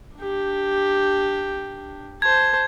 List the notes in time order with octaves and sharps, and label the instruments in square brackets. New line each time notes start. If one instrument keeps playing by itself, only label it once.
[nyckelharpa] D4 G4
[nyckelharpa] C5 A5 [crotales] G#6